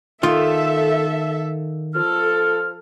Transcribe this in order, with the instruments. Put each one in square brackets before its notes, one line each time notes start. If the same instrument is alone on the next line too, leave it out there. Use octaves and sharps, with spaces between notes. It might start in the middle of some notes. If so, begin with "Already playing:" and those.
[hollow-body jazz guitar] D#3 F4 [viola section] A4 E5
[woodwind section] F3 F6 [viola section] A4